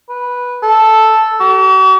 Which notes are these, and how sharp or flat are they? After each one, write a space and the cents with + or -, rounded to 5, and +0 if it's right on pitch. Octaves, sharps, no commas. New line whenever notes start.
B4 -10
A4 +0
F#4 +45